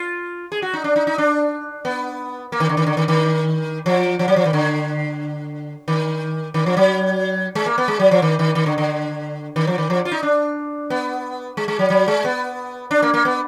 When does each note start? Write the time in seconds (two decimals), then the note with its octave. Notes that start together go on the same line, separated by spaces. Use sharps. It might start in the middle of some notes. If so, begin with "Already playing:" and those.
Already playing: F4
0.52 G#4
0.62 F#4
0.73 D#4
0.84 D4
0.96 D#4
1.07 D#4
1.18 D4
1.85 B3
2.52 A#3
2.60 D#3
2.69 D3
2.77 D#3
2.86 D3
2.97 D#3
3.08 D#3
3.86 F3
4.19 F3
4.28 F#3
4.36 F3
4.46 D#3
4.53 D3
5.88 D#3
6.54 D#3
6.66 F3
6.77 F#3
7.55 G#3
7.66 A#3
7.78 B3
7.88 G#3
7.99 F#3
8.11 F3
8.22 D#3
8.39 D#3
8.55 D#3
8.66 D3
8.78 D3
9.56 D#3
9.67 F3
9.78 D#3
9.90 F3
10.05 F4
10.12 D#4
10.23 D4
10.90 B3
11.57 G#3
11.68 G#3
11.79 F#3
11.90 F#3
12.08 G#3
12.25 B3
12.91 D4
13.02 A#3
13.14 A#3
13.25 B3